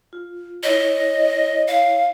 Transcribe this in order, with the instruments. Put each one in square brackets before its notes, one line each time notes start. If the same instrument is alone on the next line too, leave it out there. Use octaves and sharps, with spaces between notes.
[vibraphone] F4
[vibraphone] E4 C#5 [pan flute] D#5
[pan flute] F5